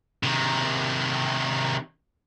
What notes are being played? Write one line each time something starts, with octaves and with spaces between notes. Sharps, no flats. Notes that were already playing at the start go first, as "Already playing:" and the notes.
C3 D#3